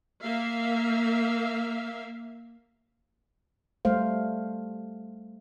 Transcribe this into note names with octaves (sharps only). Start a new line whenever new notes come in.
A#3 E5 F5
G3 A3 C5 F5